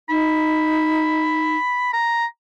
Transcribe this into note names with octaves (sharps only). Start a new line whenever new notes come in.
D#4 B5
A#5